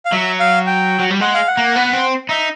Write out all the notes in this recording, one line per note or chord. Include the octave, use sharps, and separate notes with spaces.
F5
F#3 E5
F5
G5
F#3
G3
G#3 F#5
F5
F#5
A#3
B3
C4
D#4 E5